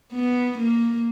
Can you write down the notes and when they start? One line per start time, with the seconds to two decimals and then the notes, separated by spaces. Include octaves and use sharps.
0.12 B3
0.58 A#3